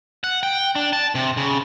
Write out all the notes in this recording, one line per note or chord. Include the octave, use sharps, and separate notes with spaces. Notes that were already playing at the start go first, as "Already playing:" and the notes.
F#5
G5
D4
A5
C3
C#3